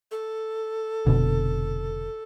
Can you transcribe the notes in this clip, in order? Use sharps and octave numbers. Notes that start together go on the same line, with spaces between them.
A4
F1 B2 D3